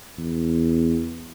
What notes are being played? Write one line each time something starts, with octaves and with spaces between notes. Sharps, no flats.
E2